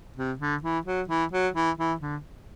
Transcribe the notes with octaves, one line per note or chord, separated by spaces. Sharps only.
C3
D3
E3
F#3
E3
F#3
E3
E3
D3